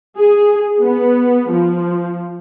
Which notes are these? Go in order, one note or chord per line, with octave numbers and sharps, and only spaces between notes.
G#4
B3
F3